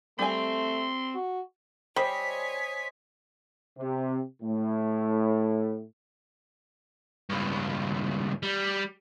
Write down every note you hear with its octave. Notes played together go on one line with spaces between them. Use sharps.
G3 A3 C4 G#5 C6
F#4
G3 C5 C#5 D#5 G#5 B6
C3
A2
C#2 G2
G3